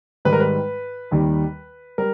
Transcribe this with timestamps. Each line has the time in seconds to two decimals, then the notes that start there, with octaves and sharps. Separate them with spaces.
0.25 G#2 D#3 G3 B4
0.33 A#4
0.40 B4
1.11 D#2 D#3 G3
1.98 G3 A#4